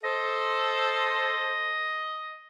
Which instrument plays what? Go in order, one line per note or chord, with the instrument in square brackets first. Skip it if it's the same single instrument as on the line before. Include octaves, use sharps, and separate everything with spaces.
[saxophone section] A4 C5 [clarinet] D#5